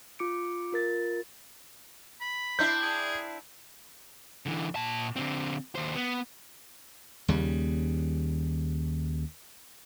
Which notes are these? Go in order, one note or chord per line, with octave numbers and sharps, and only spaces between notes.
F4 D6 C#7 D7
F4 A#4 A6
B5
C4 D4 E4 G6
G#4
D3 E3
A#2 A5
D3 C4
D#2 C5
B3
D#2 C#3 G3